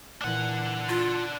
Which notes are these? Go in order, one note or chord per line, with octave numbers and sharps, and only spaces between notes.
A#2 E3 D4 F#5
F4